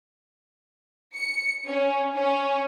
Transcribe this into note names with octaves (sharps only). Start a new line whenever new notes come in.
C#7
C#4
C#4